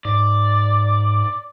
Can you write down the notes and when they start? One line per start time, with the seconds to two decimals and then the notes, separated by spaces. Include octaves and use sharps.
0.05 G#2 D5